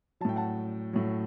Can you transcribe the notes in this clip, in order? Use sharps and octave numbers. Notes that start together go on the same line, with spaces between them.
A2 F#3 G5 A5
F#5 A5
A2 F#3